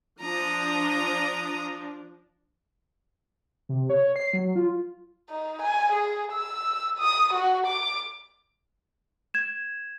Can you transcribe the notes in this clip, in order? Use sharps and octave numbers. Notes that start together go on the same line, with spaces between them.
F3 D4 A#5 D#6
C3
C#5
C7
F#3
F4
D#4
G#5
G#4
E6
D#6
F#4
D6
G#6 E7